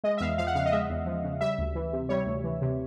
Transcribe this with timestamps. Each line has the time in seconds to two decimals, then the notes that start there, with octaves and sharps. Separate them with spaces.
0.04 G#3 D#5
0.18 E5
0.20 E2 F5
0.38 F3 F5
0.47 F#5
0.55 C#3 F5
0.66 D#5
0.72 G#3 E5
0.89 E2
1.06 F3
1.24 C#3
1.41 G3 E5
1.58 D2
1.75 E3
1.93 C3
2.09 G3 C#5
2.27 D2
2.44 E3
2.61 C3